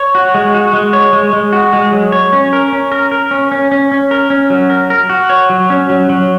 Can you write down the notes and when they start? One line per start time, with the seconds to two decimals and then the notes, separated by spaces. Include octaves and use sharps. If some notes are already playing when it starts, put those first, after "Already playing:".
Already playing: C#5
0.15 F#4
0.35 G#3
0.54 F#4
0.73 G#3
0.93 C#5
1.13 G#3
1.33 G#3
1.53 F#4
1.73 G#3
1.92 F#3
2.12 C#5
2.33 C#4
2.53 A#4
2.73 C#4
2.92 A#4
3.11 A#4
3.31 C#4
3.52 C#4
3.72 C#4
3.92 C#4
4.11 A#4
4.30 C#4
4.50 F#3
4.70 A#4
4.90 A#4
5.10 F#4
5.30 C#5
5.50 F#3
5.70 C#4
5.90 F#3
6.09 F#3